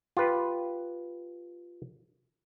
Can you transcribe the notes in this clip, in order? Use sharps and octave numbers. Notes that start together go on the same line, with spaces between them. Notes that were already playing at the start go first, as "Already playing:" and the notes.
F4 G4 B4